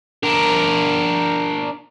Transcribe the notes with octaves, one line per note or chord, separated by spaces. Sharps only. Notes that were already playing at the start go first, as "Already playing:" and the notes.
D4 A#4